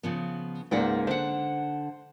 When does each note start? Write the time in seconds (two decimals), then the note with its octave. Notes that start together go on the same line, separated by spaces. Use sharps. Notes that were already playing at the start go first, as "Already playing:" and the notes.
0.03 C#3 F3 B3
0.71 C#2 G#2 A#3 D5 F#5 G5
1.07 D3 C5 F#5